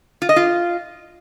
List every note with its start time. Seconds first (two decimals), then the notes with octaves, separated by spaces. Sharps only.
0.22 F4
0.29 D#5
0.36 F4